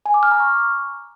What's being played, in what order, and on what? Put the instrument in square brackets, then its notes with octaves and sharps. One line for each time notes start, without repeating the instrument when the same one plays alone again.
[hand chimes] G#5
D6
F6
A#5
C#6